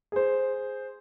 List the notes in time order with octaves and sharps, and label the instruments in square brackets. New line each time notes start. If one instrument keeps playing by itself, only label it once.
[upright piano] G#4 C5